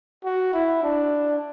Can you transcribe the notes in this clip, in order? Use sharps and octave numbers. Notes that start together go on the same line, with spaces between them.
F#4
E4
D4